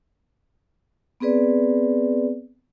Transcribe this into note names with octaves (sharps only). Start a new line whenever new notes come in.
B3 C4 G#4 B4 D5